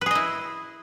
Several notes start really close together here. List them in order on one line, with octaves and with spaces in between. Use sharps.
B4 G#4 D#5 E4